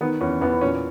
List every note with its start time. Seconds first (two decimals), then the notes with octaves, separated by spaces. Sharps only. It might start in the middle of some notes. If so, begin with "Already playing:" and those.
0.01 D#3 B3
0.21 E2 C#4
0.41 E2 B3
0.61 A#2 C#4